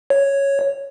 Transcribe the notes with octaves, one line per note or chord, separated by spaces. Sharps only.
C#5